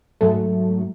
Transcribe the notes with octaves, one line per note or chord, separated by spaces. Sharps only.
G#2 F#3 A3